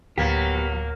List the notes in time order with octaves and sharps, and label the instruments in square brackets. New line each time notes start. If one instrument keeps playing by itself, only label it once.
[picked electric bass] D1 [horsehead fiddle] F#3 [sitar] A#3 [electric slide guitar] B3 G4